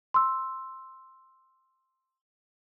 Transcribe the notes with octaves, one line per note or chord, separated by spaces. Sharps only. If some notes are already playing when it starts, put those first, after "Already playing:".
C6 E6